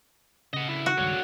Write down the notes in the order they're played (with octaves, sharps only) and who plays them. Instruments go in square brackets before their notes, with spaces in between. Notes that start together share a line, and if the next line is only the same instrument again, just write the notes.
[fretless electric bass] C#3 [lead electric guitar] D#5 F#5
[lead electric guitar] D3 E4
[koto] F#4
[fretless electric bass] C#2 G2 D#3 [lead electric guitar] D3 C#5